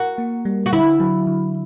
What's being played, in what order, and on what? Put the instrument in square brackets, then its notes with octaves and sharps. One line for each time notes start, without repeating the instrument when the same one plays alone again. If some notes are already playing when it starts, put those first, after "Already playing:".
Already playing: [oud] F#4 [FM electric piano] A#4
[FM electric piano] A#3
G3
[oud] F#4
[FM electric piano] D3 [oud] E4
[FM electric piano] F#3
D3